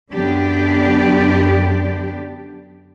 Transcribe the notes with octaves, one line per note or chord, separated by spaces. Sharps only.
F#2 D3 B3 D4 G4 D5